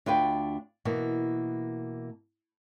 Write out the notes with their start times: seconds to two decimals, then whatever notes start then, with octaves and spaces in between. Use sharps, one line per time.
0.06 D2 D4 F4 B4 G5
0.85 B2 E3 A#3